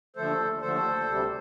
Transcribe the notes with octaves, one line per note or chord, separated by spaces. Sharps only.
D#2 D3 F3 A3 A4 C5
D#2 D3 F3 A3 A4 C5
D2 C3 G3